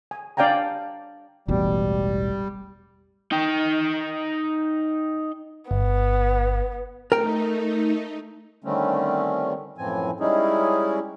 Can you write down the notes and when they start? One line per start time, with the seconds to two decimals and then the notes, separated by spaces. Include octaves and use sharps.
0.11 G#5
0.37 D4 D5 F5 G5 G#5 A#5
1.48 E1 A1 B2 G3
3.31 D#4 G5
5.71 G1 B3
7.12 A3 D#4 A#4 G5
8.64 D3 D#3 G3 A3 C4 C#4
9.78 F#2 A2 E3 F3 C4 G#5
10.20 G3 G#3 C#4 D#4 E4 G#4